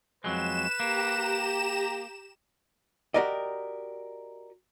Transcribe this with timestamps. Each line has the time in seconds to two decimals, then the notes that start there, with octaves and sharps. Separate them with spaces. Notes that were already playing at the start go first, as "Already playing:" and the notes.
0.24 F2 F#3 G#3 B4 E7
0.80 A#3 G4 A#5
3.14 F#4 G4 A#4 D5 D#5